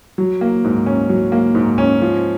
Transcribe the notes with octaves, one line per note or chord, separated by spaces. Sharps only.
F#3
A#3
G#2
C#4
F#3
A#3
G#2
C#4
F3